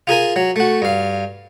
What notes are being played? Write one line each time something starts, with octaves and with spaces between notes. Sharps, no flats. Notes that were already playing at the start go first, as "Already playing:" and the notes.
F4 G#4 A#4 G#5
F#3
A3 F#4
G2 F5